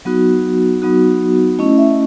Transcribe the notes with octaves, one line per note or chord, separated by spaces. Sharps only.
F#3 B3 D#4 F#4
F#3 B3 D#4 F#4
A3 C#4 E4 D#5
E5
D#5